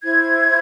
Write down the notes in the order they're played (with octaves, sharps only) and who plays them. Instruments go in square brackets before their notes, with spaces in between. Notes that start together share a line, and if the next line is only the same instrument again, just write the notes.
[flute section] E4 C5 G#6